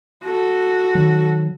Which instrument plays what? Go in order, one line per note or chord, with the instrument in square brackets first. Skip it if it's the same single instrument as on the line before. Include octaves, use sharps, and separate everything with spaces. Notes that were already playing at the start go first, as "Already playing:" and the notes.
[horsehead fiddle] F#4 A4
[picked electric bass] D#3 F#3